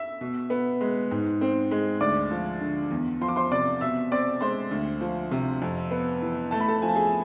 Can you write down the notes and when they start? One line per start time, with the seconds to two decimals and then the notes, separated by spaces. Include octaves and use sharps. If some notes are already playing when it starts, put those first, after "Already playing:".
Already playing: E5 E6
0.21 B2
0.50 B3
0.81 G#3
1.11 G#2
1.41 C4
1.71 G#3
2.00 D2 D5 D6
2.31 F3
2.61 D3
2.91 E2
3.21 F3 C6
3.29 D6
3.36 C5 C6
3.51 C3 D5 D6
3.81 B2 E5 E6
4.11 C4 D5 D6
4.41 G#3 C5 C6
4.71 D2
5.01 F3
5.32 C3
5.62 F2
5.91 B3
6.22 E3
6.51 A3 A5
6.60 B5
6.68 A4 A5
6.82 F3 G#5
6.89 A5
6.96 G#4 G#5